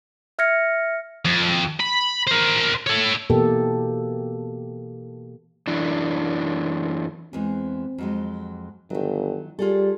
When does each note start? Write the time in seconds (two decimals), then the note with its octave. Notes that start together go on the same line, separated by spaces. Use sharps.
0.39 E5 F6 G#6 A#6 C#7
1.25 F2
1.80 B5
2.27 A#4 C5
2.87 A4 C#5
3.30 B2 E3 A#3 G4 A4
5.67 F#2 E3 D4
7.33 E2 E3 G#3 C4
7.98 F2 F#3 G#3
8.90 G1 D#3 F#3
9.59 G3 F4 G#4 A4